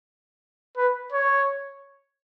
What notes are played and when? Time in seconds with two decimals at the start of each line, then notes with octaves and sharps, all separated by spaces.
0.77 B4
1.13 C#5